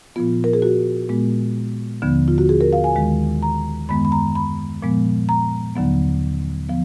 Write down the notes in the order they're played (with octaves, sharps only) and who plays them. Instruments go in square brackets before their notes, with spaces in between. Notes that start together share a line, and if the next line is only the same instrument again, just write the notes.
[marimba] A#2 F3 B3 F4
A#4
G#4
F#4
A#2 G#3 B3
D#2 D3 F3 B3
F4
F#4
G#4
A#4
F5
G#5
D#2 D#3 G#3
A#5
F#2 D#3 G#3 B3 B5
B5
A#5
B5
A#2 F3 G#3 B3
A#5
D#2 D3 F#3 B3
F3 B3